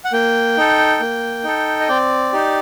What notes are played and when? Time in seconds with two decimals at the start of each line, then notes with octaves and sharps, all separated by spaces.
0.05 F#5
0.13 A#3 G5
0.57 D#4 A4
1.00 A#3
1.44 D#4 A4
1.80 D#5
1.89 C4 D5
2.33 D#4 G4